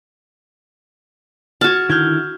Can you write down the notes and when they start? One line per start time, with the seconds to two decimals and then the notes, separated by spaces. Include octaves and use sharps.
1.61 F#4 A5 F6 G#6
1.89 D3 D#3 E4 F6 G6 G#6